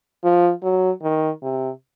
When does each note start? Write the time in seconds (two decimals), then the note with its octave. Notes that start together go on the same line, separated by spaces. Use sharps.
0.24 F3
0.63 F#3
1.02 D#3
1.42 C3